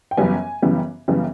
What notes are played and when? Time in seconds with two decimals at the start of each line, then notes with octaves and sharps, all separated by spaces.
0.11 G5
0.17 F#2 C#3 E3 G3 B3 G#5
0.62 F#2 C#3 E3 G3 B3
1.08 F#2 C#3 E3 G3 B3